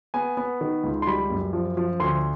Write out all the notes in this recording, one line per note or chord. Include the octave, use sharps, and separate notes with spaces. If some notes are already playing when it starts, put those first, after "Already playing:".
B3 G#5
B3
D#3
C#2
C6
G3 B5
F#2
F3
F3
D2 C6